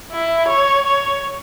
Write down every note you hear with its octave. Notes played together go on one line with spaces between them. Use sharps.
E4
C#5
C#5